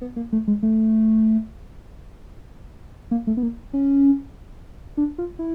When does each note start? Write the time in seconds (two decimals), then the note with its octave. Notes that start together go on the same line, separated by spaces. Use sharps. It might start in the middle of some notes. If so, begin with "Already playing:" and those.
0.01 B3
0.16 A#3
0.32 A3
0.48 G#3
0.63 A3
3.11 A#3
3.27 A3
3.37 B3
3.43 A#3
3.73 C#4
4.97 D4
5.18 F4
5.39 E4